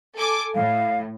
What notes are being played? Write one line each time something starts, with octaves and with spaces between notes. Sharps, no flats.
A4 G#5 D6
A2 F5